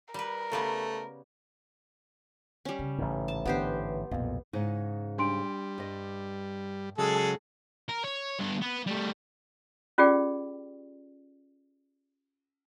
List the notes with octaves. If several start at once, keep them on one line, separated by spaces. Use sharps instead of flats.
G3 A#4 B4
C#3 G3 A3 B3
G3 C#4
C#3
A1 G#2
A5
D3 B3 G4 C5
B1 F2 A#2
G#2 C#3 D#4
G3 D4 C6 D7
G2 D#5
C#3 F#3 G#3 G#4 A4
A#4
C#5
G2 B3
B3
G3 A3
C#4 F4 G4 G#4 D5 G5